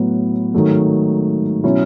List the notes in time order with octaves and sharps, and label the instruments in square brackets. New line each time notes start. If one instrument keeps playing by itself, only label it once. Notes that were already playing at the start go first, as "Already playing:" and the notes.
Already playing: [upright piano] A2 F#3 B3
G#1 G#2 D#3 F#3 A3
B2 F#3 C#4 E4